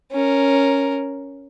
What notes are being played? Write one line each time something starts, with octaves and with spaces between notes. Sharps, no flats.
C#4 A#4